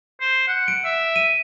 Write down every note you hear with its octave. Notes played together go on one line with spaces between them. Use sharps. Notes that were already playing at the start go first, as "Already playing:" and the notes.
C5
F#5
D7
E5
D#7